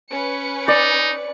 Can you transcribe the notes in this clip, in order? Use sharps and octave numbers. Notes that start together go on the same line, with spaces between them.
C#4 B4 C#7
D#4 D5